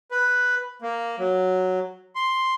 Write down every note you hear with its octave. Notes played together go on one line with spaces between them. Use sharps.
B4
A#3
F#3
C6